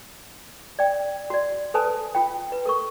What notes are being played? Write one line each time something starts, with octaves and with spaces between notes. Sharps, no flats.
D5 G5
F#4 D5
A4 B4 C5 G#5 A5 D#6
F4 G5
B4
A4 A#4 C#6